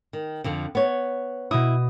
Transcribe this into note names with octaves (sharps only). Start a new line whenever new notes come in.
D#3
F2 D3 F3
B3 C#5
B2 E4 D#6